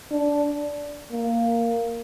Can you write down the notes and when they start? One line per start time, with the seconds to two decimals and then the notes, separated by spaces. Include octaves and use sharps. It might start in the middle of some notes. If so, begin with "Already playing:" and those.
0.11 D4
1.11 A#3